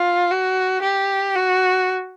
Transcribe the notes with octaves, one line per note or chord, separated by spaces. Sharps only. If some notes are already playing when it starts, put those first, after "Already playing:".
Already playing: F4
F#4
G4
F#4